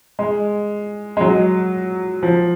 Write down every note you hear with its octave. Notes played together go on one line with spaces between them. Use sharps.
G#3
G#3
F#3
F3